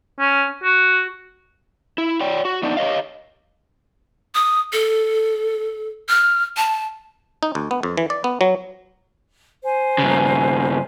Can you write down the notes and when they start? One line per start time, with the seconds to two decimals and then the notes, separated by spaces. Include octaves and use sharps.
0.19 C#4
0.64 F#4
1.98 E4
2.21 C#5 D5 G5
2.45 F#4
2.63 B3 D4 D#4
2.77 G4 C#5 D#5 F5
4.35 D#6
4.73 A4
6.09 F6
6.57 A5
7.43 D#4
7.55 D2
7.71 B3
7.83 F2
7.97 E3
8.10 D5
8.24 B3
8.41 F#3
9.64 C5 G#5
9.98 G2 C#3